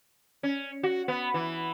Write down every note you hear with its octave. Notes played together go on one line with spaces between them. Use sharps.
C#4
F#4
B3
E3